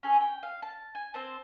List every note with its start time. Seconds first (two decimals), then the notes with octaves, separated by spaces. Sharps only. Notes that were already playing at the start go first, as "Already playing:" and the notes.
0.03 C#4 G#4 A4
0.21 G5
0.43 F5
0.62 A5
0.95 G#5
1.14 C4 C5 A5